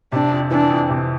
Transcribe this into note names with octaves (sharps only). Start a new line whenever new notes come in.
C3 D4
F2
E3 D4
F2
C3